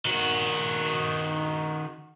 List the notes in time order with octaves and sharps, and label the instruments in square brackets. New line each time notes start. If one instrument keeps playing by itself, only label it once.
[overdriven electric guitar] D#3 F#4